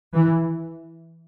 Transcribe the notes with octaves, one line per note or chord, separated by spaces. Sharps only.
E3